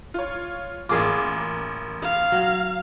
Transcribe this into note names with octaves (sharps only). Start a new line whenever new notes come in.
F4 C#5
A1 A#3 F4 G#4 D6
F5
F#3